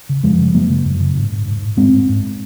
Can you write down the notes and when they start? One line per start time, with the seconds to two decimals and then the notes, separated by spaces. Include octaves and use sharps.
0.09 C#3
0.24 F#2 F3 G#3
0.39 C#3
0.54 F#2 F#3 A#3
0.70 C#3
0.85 F#2
1.00 C#3
1.17 G#2
1.32 G#2
1.47 G#2
1.62 G#2
1.77 G#2 G#3 C4
1.93 G#2
2.09 G#2